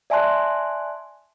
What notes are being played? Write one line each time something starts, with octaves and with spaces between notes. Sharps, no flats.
D5 E5 G#5 A5 C6 F#6